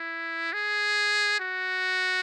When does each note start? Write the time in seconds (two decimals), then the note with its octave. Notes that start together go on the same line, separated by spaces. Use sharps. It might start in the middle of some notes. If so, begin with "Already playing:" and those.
Already playing: E4
0.53 G#4
1.40 F#4